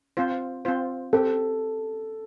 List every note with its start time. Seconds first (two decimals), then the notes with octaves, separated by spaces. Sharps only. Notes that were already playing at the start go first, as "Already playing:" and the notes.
0.17 C4 F4 C5
0.65 C4 F4 C5
1.13 C4 G4 A4